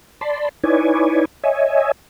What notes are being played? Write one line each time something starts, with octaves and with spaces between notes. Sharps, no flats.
D5 A5 B5 C6
D#4 E4 B4 C#5 D5 G#5
C#5 D#5 E5 G#5